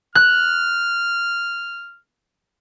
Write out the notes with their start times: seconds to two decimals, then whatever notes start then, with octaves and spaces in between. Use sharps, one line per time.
0.15 F6 F#6